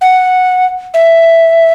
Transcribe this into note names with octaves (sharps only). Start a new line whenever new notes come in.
F#5
E5